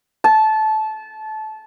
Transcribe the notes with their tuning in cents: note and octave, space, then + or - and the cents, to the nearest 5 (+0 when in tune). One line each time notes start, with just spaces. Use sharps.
A5 -20